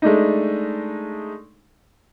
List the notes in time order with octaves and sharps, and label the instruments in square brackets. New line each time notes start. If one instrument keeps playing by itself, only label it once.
[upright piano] G#3 A3 D4 D#4